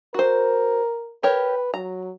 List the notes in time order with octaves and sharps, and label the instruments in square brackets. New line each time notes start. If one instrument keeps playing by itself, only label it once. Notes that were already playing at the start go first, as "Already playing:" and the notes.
[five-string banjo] F#4 C5 [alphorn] A#4
[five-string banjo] G4 A#4 C#5 [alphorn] B4
[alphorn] F#3 [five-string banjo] A#5